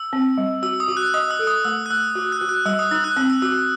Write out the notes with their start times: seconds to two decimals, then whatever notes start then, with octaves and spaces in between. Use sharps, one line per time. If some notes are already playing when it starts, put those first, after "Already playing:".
Already playing: E6
0.13 C4
0.38 G3
0.63 F#4 E6
0.80 D#6
0.88 F#4
0.97 F#6
1.14 D#5 D#6
1.31 E6
1.39 A4
1.47 D#6
1.64 A3 E6
1.86 F#6
1.91 A3 E6
2.15 F#4
2.32 F#6
2.41 F#4
2.49 F#6
2.66 G3 E6
2.79 D#6
2.91 D#4 E6
3.04 F#6
3.16 C4 E6
3.30 E6
3.42 F#4 E6